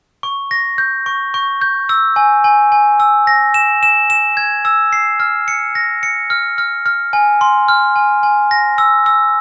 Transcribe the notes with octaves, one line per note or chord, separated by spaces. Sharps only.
C#6
A#6
G6
C#6
C#6
G6
E6
G#5
G#5
G#5
E6
A#6
E7
E7
E7
G#6
E6
C7
F6
C#7
A#6
C#7
F6
F6
F6
G#5
C6
F6
G#5
G#5
A#6
E6
E6